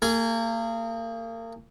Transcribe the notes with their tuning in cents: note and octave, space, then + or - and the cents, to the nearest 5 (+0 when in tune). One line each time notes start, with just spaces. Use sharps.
A#3 -35 G#4 +0 G#5 +0